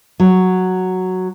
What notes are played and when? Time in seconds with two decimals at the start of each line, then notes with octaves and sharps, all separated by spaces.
0.20 F#3